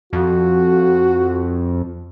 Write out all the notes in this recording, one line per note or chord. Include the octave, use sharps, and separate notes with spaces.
F2 F#4